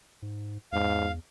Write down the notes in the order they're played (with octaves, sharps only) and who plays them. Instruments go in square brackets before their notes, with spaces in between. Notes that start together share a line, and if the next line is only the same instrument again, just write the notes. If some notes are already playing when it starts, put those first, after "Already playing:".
[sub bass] G#2
[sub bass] E2 [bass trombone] G#2 [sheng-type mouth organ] F5